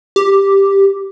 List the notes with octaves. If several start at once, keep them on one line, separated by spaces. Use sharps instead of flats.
G4